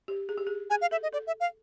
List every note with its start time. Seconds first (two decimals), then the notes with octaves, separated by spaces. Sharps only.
0.08 G4
0.29 G#4
0.37 G4
0.47 G#4
0.70 G#4 G#5
0.81 F5
0.91 A4 E5
1.03 D#5
1.13 A4 D5
1.27 E5
1.40 F5